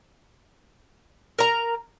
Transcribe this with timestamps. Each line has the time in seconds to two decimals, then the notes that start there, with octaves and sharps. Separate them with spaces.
1.39 A#4 A#5